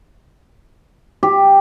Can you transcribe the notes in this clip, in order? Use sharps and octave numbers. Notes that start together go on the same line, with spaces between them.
G4